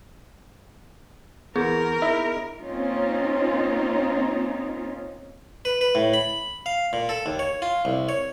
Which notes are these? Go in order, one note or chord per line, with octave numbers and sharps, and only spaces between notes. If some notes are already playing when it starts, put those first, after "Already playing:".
E2 B3 G#4 A#4
D#4 E4 E5
A#3 C4 C#4 D#4 F4
B4
B4
A2
B5
F5
A#2
A4
D#2
C#5
F4
C2
C#5